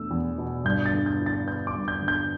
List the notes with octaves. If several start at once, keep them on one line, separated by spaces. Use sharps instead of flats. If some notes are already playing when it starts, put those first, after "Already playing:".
Already playing: E2 B2 A3 D4 E6
E2
B2
G2 G6
A6
D3
G6
E4
A6
B3 G6
D6
G2
G6
D3
G6